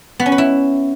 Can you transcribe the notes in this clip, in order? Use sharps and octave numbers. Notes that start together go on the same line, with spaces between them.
B3
C#4
B4
E4